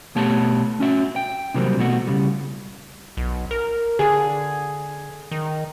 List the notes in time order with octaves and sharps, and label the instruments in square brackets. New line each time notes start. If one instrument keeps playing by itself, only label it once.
[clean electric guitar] B2 A3 G4 C#5 A5
C#4 F#4 E5
G5
C3 E3 F#3 G3 A#3 C4
B2 A3 F#4
C#3 G3
[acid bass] B1
A#4
[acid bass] D3 [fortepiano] G#4
[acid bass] D#3